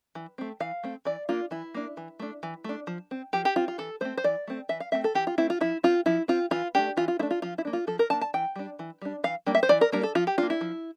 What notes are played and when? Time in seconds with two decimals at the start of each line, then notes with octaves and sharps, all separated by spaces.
0.15 E3
0.38 A3 C4
0.60 E3 F5
0.83 A3 C4
1.05 E3 D5
1.29 A#3 D4 F4
1.51 E3 E4
1.74 A#3 D4
1.97 E3
2.20 A3 D4
2.43 E3
2.64 A3 D4
2.87 F3
3.11 C4
3.33 F3 G4
3.45 G4
3.56 C4 F4
3.68 F4
3.78 E3 A4
4.01 A3 C4 C5
4.17 C5
4.24 E3 D5
4.48 A3 C4
4.69 E3 E5
4.80 F5
4.92 A3 C4 E5
5.04 A4
5.15 E3 G4
5.27 F4
5.38 A3 C4 E4
5.50 F4
5.61 F3 E4
5.83 C4 F4
6.06 F3 E4
6.28 C4 F4
6.51 E3 F4
6.75 A3 D4 G4
6.97 E3 F4
7.08 F4
7.19 A3 D4 E4
7.31 F4
7.42 F3 F4
7.58 E4
7.65 A#3 D4
7.73 F4
7.87 F3 A4
7.99 A#4
8.10 A#3 D4 A5
8.21 A5
8.34 E3 G5
8.56 G3 D4
8.79 E3
9.02 G3 D4
9.24 E3 F5
9.46 G3 A#3 D4
9.55 E5
9.63 C5
9.69 E3 D5
9.81 A#4
9.92 G3 A#3 D4 A#4
10.03 A4
10.15 F3 F4
10.27 G4
10.38 D4 F4
10.42 A#3
10.50 E4
10.61 F3